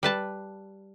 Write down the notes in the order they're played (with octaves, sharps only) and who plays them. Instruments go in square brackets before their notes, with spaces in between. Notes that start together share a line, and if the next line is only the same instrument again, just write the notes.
[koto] G3 B4 A5